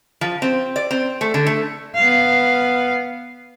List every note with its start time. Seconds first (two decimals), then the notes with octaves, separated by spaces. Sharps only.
0.21 F3
0.42 C4
0.76 D5
0.91 C4
1.21 A3
1.34 D3
1.46 A3
1.95 B3 F5